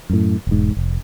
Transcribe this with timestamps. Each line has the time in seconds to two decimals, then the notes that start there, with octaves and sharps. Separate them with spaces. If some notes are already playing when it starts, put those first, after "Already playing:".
0.10 F#2 A2
0.47 E1 G#2
0.77 F1